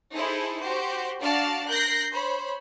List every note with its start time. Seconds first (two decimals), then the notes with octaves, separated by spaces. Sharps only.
0.13 D#4 E4 G#4 A4 C5
0.59 F#4 G4 C5
1.20 D4 F#4 D5 F5 A5 F6
1.66 A#4 F#6 G6 A#6 C7
2.11 C5 C#5 B5